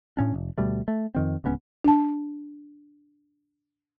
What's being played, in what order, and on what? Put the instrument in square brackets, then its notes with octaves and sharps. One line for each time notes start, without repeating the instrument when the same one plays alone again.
[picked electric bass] A2 C#4 D4
F1
D2 B2 G3 A3
A3
F2 D#3 C4
D1 C#2 B3 C#4
[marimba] D4 A5